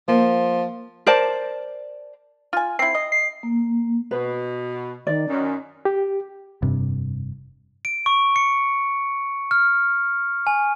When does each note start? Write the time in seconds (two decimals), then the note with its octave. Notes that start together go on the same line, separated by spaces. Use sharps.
0.08 F3 A#3
1.06 A#4 C5 D5 A5
2.53 F4 G#5
2.79 C4 E4 C7
2.95 D#5
3.12 C7
3.43 A#3
4.11 B2 B4
5.07 D#3 D5
5.29 F#2 D#3 C#4
5.85 G4
6.62 F1 G2 C3
7.85 D7
8.06 C#6
8.36 C#7
9.51 F6
10.47 G#5